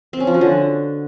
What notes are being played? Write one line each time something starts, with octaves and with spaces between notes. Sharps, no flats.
C4
C#4
F3
F#4
D3